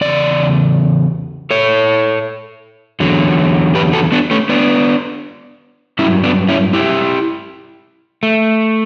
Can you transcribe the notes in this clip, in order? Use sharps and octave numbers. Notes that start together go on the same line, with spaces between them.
E2 C#3 D5
A4 C#5
E2 D3 F#3
G4 B4
F#4 A4
B3 D4
A3 C#4
B3 D4
G2 F#3 C#4 E4
B3 D4
C#4 E4
E4 G4
A3